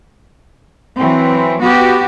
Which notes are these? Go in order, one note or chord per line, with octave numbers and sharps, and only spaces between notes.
E3 F#3 C4
B3 F#4 G4